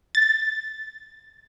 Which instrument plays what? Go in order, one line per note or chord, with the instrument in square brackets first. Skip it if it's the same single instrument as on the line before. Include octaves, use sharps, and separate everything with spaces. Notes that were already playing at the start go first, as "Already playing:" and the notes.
[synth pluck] A6